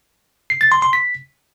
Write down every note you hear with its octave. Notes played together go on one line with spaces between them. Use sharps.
C7
A6
C6
C6
B6